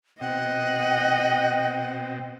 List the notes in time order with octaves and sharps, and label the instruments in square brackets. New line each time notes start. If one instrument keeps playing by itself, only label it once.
[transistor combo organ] B2 C4 [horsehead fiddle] D#5 [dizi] F#5 [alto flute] G5